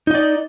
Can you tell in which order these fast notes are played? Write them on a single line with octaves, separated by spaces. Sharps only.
D#4 D#5 D5